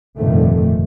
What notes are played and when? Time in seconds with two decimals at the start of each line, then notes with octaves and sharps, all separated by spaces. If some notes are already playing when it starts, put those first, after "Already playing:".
0.17 F1 G2 A#2 D3 D#3 A3